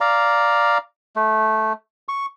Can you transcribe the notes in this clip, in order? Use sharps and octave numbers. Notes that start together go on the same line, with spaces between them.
D5 F5 A#5
A3
C#6